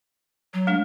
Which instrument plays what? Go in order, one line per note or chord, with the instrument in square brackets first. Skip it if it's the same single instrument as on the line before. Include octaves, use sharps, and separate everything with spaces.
[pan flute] F#3
[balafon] G#3 A3 D4